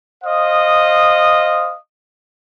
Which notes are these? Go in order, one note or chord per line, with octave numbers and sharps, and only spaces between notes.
C5 D#5 F5 D#6